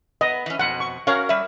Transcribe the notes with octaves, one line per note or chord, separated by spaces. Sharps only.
B3 D#5
E3 C#4
F2 B2 F#5
C#6
C#4 F#4 A#4 C#5 F5
G3 E5